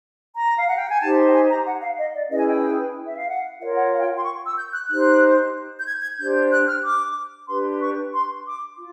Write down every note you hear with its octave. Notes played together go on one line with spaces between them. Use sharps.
A#5
F5
F#5
G5
G#5
D#4 G4 C5 A5
G5
G#5
A#5
F#5
F5
D#5
D5
C#4 E4 G#4 B4 D#5
G#5
G5
E5
F5
F#5
F4 A#4 C#5 F5
F#5
F5
G5
C6
C#6
E6
G6
F#6
D#4 G4 C5 F#6
G6
G#6
G#6
D4 G4 C5 G6
F#6
F6
D6
D4 G4 B4 C6
C#6
C6
D6
F4